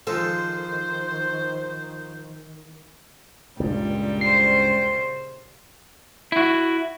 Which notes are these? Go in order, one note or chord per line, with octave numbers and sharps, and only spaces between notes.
D#3 F3 G#3 A4 C5
C#2 G2 A#2 G3
C#3 C5 C7
E4 F#4